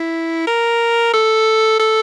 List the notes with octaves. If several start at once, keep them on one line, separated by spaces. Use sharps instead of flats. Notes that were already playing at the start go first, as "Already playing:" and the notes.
Already playing: E4
A#4
A4
A4